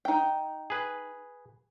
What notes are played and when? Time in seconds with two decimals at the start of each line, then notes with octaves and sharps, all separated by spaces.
0.05 D#4 G5
0.70 G#4 B4